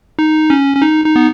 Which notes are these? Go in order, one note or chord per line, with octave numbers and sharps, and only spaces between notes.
D#4
C#4
C#4
D#4
D#4
B3